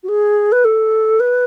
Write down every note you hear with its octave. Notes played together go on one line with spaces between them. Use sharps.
F#4
G#4
B4
A4
B4